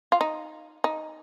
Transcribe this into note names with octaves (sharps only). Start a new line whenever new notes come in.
F4
D#4
D#4